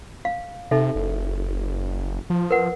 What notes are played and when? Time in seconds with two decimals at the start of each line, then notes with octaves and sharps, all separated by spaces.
0.25 F5
0.71 C3 D#4 A4 E5
0.95 F#1
2.30 F3
2.51 A#4 B4 F#5